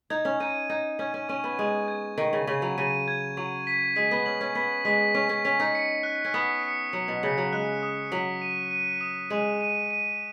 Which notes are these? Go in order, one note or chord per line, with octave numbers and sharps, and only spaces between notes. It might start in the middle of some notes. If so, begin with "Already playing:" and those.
D#4 G#6
C#4
D#4 D#7
D#4 G#6
C#4 G#6
C#4
C#4 C#6
B3
G#3 C#6
G#6
D#3 C#6
C#3
C#3 C#6
F#3
C#3 D#7
G#6
F#3 C#6
B6
G#3 B6
B3
C#4 F#7
C#4
B3 B6
G#3 B6
C#4 C#6
C#4
C#4 B6
D#4
C#7
F#6
C#4
B3 D#6
C#7
F#3 C#7
B2
C#3 C#7
F#3
G#3 F#6
D#6
F#3 B6
D#7
D#7
D#6
G#3 D#7
D#7
D#7